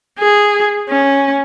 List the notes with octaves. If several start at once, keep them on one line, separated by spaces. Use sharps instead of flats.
G#4
C#4